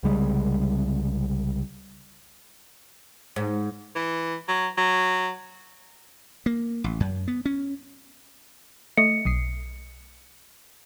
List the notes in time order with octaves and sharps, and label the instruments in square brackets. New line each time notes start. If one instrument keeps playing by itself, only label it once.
[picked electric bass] C2 C#3 G3 G#3
[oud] G#2
[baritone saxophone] E3
F#3
F#3
[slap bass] A#3
A1
F#2
B3
C#4
[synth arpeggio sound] A3 D#5 [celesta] C#7
[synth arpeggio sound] B1 D#6 C7